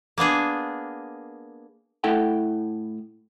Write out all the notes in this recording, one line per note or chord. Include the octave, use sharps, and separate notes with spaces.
A#3 B3 D4 G#4
A2 E4 A4 F#5 G5